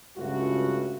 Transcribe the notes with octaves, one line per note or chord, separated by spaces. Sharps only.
C#2 G2 C#3 A3 F4 F#4